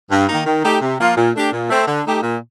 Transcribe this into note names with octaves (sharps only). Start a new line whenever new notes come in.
G2
D#3 A#3 D#4
D#3
A3 D#4 G4
C3
F3 A#3 F4
A#2
A3 D4 G4
A#2
A3 C4
D3
A3 D#4 G4
A#2